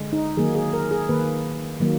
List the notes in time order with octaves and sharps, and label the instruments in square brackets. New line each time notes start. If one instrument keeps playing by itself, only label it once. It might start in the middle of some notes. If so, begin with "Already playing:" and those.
Already playing: [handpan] D3 G#3
D#4
D#3 F#3 A#3 G#4
G#4
A#4
G#4
D#3 A#3 B4
D#3 F#3 A#3